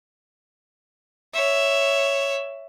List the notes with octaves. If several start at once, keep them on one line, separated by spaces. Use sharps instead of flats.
C#5 E5